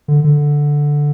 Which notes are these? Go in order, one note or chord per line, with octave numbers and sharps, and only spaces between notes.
D3
D3